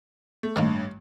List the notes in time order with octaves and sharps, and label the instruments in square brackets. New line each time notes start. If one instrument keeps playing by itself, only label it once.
[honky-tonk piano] A3
[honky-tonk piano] A1 G2 [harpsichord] D#3 A3 A#3